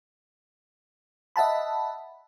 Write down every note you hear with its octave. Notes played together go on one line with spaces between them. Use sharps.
D#5 E5 F#5 A5 B5